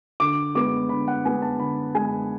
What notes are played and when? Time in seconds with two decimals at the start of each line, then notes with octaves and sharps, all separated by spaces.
0.20 D3 D6
0.55 G#3 B3 D6
0.89 D3 B5
1.08 F#5
1.25 G#3 B3 G#5
1.42 A5
1.60 D3 B5
1.95 G#3 B3 G#5